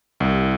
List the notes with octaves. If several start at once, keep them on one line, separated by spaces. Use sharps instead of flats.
C2